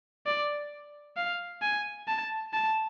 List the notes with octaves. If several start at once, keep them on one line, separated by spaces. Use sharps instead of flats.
D5
F5
G#5
A5
A5